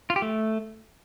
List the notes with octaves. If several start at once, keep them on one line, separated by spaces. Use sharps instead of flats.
F4
G4
A3